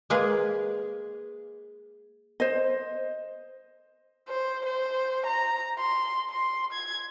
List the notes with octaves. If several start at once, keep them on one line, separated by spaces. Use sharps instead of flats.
G#3 A#3 G#4 B4
C5 D#5
C5
C5
A#5
C6
C6
G#6